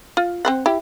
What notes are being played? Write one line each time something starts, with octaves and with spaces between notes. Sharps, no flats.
F4
C4 C5 F#5
E4 G4